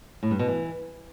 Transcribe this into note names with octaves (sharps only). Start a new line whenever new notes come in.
A2
G2
B2
E3